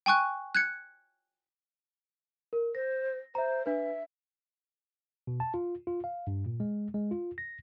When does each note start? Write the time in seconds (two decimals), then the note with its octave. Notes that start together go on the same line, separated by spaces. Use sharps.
0.06 G5 G#5 C#6 F#6
0.55 F#6 G#6 C#7
2.53 A#4
2.75 C5 A#6
3.35 C5 E5 A#5
3.66 D4 B4 E5
5.27 B2
5.40 A5
5.54 F4
5.87 F4
6.04 F5
6.27 G2
6.46 A#2
6.60 G#3
6.94 G#3
7.11 F4
7.38 A#6